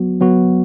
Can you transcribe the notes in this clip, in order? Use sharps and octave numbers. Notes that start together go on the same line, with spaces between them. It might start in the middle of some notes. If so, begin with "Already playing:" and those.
Already playing: F#3 B3 F#4
F#3 B3 F#4